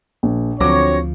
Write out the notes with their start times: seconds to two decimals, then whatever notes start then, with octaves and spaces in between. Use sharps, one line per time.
0.23 A#1
0.60 D2 D3 F3 F#3 C4 C#5 D6 A#6